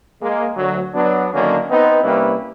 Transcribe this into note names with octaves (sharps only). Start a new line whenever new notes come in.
G#3 A#3
D2 F#3
F#3 B3 D4
D3 D#3 F#3 A#3 C#4 D4
B3 C4 D#4
C3 G3 A#3 C#4 E4 B4